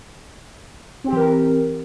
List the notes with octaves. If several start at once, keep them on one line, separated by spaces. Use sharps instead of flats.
E3 C4 G4 A#4